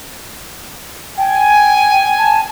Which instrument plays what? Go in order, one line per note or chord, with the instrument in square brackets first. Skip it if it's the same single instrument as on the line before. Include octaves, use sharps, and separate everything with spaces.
[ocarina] G5 [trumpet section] G#5
[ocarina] A5